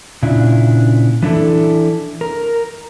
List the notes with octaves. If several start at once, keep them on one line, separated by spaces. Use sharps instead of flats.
A#2 C#3 D4 E4
E3 D4 E4 A4
A#4